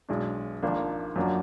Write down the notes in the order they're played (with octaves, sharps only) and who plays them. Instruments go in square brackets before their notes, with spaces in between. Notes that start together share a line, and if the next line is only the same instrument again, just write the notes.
[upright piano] B1 B2 G#3 D4
G#1 G#2 F3 A#3 D4
F#2 F3 A#3 D4 F#4